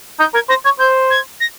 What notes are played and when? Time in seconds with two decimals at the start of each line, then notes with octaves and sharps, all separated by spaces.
0.19 D#4 G6
0.34 A#4 G#6
0.49 C5 A#6
0.65 C#5 G#6
0.79 C5 G6
1.10 G#6
1.40 A#6